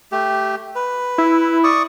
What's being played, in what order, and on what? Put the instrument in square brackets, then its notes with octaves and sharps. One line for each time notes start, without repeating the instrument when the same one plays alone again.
[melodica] A3 G4
B4
[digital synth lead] E4
[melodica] D5 C#6 D#6